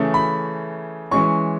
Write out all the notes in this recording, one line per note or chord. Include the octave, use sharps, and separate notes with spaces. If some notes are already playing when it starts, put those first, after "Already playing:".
Already playing: C#3 E3 A3 C#4
B5
E3 G#3 C#4 C#6